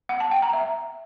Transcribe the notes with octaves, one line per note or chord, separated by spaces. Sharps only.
F#5
A5
G5
A#5
E5